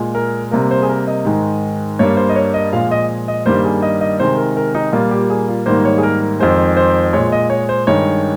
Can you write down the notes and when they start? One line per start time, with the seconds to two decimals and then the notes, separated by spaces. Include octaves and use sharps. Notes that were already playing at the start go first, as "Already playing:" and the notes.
Already playing: A#2 G#3
0.15 A#4
0.51 C3 G3 A#3 A#4
0.71 C5
0.82 G#4
0.89 A#4
1.08 D#5
1.25 G#2 D#3 G#3
1.99 G2 G3 A#3 C#5
2.17 C5
2.29 D#5
2.36 C#5
2.54 D#5
2.73 A#2 F3 G#3 F5
2.91 D#5
3.28 D#5
3.46 G2 D#3 G3 A#3 C5
3.64 G#4
3.82 D#5
4.01 D#5
4.20 C3 D#3 G#3 C5
4.37 A#4
4.57 A#4
4.75 D#4
4.93 A#2 G3 A#3 F4
5.11 G4
5.30 G#4
5.48 F4
5.66 G#2 D#3 G3 A#3 C5
5.85 C#5
5.98 G#4
6.03 A#4
6.39 F2 D#3 G#3 C5
6.77 C5
7.13 A#2 G#3 C#5
7.32 D#5
7.50 C#5
7.69 C5
7.87 G2 D#3 G#3 C#5